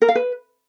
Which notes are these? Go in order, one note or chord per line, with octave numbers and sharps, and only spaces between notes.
A#4
F5
B4